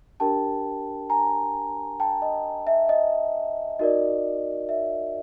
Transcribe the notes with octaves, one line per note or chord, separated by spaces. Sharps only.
D4 G4 A#4 G5 A5
G#5 A#5
G5 A5
D#5
E5
D#5
D#4 F#4 A#4 D5 D#5
E5